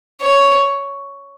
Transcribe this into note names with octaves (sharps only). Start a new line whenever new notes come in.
C#5